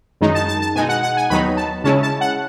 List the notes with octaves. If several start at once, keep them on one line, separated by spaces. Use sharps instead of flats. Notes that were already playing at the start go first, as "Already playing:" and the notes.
F#2 D#3 G#3 D#4
A5
A5
A5
B2 G#3 D#4 G#5
F#5
F#5
G#5
D#2 D#3 F#3 B3 D#4 B5
A5
C#3 G#3 C#4 E4 A5
A5
F#5